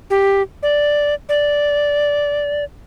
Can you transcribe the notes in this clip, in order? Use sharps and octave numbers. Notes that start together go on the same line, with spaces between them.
G4
D5
D5